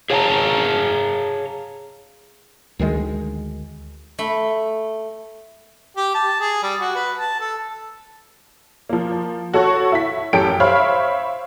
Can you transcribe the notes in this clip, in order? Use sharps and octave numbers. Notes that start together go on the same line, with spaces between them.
G#4 C#5 F5 G5 A5 A#5
D2 D#3 G3 G#3
A3 B5
G4
A5
G#4
G3
F#4
B4
A5
A4
F3 A#3
F#4 A4 C#5 F#5 C#6
E4 B6
A1 F#2 G4 A4 G5 D7
C5 C#5 E5 F5 B5 F6